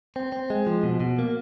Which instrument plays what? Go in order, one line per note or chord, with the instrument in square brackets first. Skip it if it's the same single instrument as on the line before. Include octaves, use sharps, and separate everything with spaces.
[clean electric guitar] C4
C4
G#3
F3
B2
B2
A#3